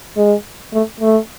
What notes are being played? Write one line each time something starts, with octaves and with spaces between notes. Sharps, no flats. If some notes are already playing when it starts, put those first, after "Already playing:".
G#3
A3
A3